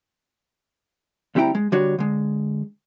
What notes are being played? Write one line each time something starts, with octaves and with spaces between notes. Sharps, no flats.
D2 G3 C4 E4 G5 A#5
G#3
D3 G3 D4 F#4 C#5
D3 G#3